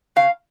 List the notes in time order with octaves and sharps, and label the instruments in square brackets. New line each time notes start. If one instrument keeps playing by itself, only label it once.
[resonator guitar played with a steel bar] C#3 F5